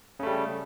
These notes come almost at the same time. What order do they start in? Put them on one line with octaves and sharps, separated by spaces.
C#3 A3 G3